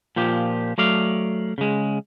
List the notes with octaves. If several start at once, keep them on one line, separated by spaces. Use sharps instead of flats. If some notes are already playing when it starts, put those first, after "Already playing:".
A#2 F3 G4
F#3 A3 D5 F5
C#3 G#3